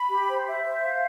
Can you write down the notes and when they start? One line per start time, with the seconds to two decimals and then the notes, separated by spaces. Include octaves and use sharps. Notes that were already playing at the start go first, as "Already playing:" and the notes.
Already playing: B5
0.10 G4
0.29 C5
0.47 E5
0.65 C5
0.83 F5